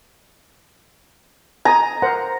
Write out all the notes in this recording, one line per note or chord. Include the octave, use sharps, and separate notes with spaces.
G#5 A#5 D#6
A#4 C5 F#5